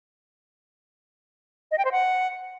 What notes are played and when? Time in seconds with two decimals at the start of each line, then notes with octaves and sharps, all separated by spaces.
1.71 D#5
1.78 G5
1.85 C5
1.92 F#5